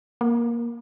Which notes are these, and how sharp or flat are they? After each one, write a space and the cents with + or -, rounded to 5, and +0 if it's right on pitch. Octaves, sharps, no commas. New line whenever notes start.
A#3 +15